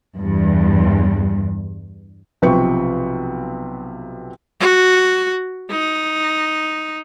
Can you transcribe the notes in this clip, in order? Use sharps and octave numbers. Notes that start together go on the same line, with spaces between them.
E2 G2
B1 C3 F3 B4 G5 C#6
F#4
D#4